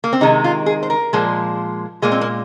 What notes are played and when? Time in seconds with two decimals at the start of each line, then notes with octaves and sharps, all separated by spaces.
0.04 A#3
0.13 C4
0.21 C3 D#3 G#3 D#4
0.44 F4
0.66 G#4
0.83 C5
0.90 A#4
1.13 A#2 F3 G#3
2.02 A#2 G#3 A#3
2.12 C4
2.21 A#3